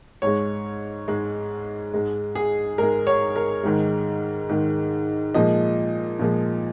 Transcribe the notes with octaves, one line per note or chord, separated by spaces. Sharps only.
G#2 G#3 C#5
G#2 G#3
G#2 G#3
G#4
G#2 G#3 A#4
C#5
A#4
G#2 D#3 G#3
G#2 D#3 G#3
A#2 F3 G#3 D#5
A#2 F3 G#3